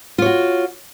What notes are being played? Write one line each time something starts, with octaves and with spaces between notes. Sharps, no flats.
F4 F#4 C#5